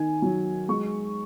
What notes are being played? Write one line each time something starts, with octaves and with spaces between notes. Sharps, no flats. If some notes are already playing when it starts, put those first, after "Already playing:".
Already playing: D#3 G#5
F#3
G#3 C#6